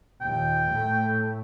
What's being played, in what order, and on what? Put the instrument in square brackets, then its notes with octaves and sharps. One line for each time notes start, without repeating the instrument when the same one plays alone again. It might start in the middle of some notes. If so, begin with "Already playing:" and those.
[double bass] D#2 A#2 [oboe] G5
[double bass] A2 A3